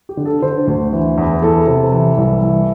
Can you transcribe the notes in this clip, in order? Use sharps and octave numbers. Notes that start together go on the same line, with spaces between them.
G4
D3
A4
D3 C5
D2
E3
E2
E3 A4
C3
E3
C2
E3